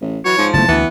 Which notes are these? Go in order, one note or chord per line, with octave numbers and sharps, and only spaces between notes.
A1
E3 F#3 C#5
G#2 F3
F#1 E2 A3 A5
D2 E3 B3